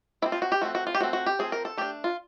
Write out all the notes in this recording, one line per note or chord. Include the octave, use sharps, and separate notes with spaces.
F3 A3 C4 E4
F4
F#4
G4
F3 A3 C4 F#4
F#4
F4
G4
F3 A3 C4 F#4
F#4
G4
F3 A3 C4 G#4
A#4
A4
A3 D4 G4
F4